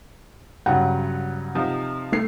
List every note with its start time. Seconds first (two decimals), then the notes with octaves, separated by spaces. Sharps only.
0.66 G2 C#3 F#3 F#5
1.55 C3 F3 D#4
2.12 A3 C7